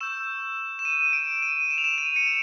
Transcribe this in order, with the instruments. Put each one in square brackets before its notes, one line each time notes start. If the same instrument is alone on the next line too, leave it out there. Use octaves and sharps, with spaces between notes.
[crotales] C#6 E6 G6 E7
E7
D#7
D7
D#7
E7
F7
E7
D#7
C#7
D7